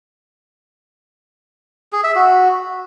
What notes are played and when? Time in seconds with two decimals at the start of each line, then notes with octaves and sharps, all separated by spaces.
1.93 G#4
2.04 E5
2.15 F#4